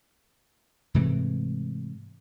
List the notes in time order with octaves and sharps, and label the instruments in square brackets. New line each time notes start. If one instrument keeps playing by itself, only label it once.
[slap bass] G#2 C3 E3 A3